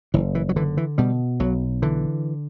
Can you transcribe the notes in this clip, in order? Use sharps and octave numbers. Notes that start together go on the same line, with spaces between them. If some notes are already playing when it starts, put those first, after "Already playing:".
F#1 E3
E3
F#3
D3 E3
E3
B2 G3
B1 F#3
D3 E3